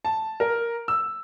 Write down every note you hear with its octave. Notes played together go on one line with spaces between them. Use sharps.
A5
A#4
E6